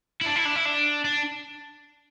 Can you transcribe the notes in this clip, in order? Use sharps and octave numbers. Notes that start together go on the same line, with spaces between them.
E4
D4
E4
D4
E4
D4
D4